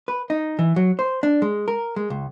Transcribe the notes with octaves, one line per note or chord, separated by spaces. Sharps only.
B4
D#4
E3
F#3
C5
D4
G#3
A#4
G#3
C#2